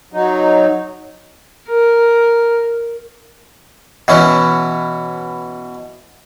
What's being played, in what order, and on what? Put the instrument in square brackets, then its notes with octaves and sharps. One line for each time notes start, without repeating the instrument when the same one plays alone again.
[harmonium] F#3 D#4
[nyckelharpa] A#4
[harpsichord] B2 E3 C#4